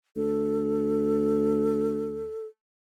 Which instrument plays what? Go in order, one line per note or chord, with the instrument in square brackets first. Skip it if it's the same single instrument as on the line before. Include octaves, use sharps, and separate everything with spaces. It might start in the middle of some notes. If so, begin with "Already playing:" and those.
[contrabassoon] D2 [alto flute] A4